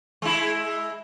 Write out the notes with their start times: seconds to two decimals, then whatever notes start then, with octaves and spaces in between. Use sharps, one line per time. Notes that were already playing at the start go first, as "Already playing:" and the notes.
0.22 G#3 E4